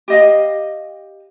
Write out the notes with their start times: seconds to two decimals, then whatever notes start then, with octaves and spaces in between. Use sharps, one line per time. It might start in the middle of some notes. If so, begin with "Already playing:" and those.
0.08 G4 D#5 F5